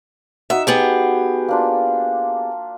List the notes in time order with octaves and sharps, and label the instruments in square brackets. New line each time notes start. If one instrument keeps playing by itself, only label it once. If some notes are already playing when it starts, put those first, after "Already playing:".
[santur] D#4 F#4 D#6 [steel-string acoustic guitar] E5
[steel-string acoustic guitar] B3 G4 G#4
[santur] A#3 D4 F4